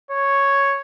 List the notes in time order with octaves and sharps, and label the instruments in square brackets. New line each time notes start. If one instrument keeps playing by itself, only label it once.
[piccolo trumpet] C#5